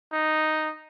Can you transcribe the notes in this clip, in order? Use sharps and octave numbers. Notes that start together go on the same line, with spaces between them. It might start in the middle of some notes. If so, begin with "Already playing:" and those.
D#4